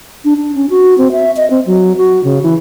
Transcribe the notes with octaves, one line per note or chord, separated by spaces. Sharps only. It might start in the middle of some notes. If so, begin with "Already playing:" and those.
D4
D4
C#4
F#4
C4
E5
D#5
C4
F#3
F#4
C#3
E3